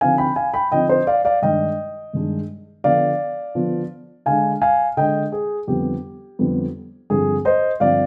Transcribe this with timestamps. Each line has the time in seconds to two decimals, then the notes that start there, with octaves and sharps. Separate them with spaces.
0.01 D3 F3 C4 D#4 F5 G#5
0.18 G5 B5
0.36 F5 G#5
0.54 G5 B5
0.72 D3 F3 C4 D#4 D#5 G5
0.89 C5 D#5
1.07 D5 F5
1.25 D5 F5
1.42 G2 D#3 G#3 D4 D#5 G5
2.13 G2 D#3 G#3 D4
2.84 D3 F3 B3 D5 F5
3.55 D3 F3 B3
4.26 D3 G#3 D4 F5 G#5
4.62 F5 G#5
4.97 D3 G#3 D4 D#5 G5
5.32 G#4
5.67 F2 D3 G3 B3 G4
6.39 F2 D3 G3 B3
7.10 G2 D3 F3 C4 G#4
7.45 C5 D#5
7.80 G2 D3 F3 C4 D5 F5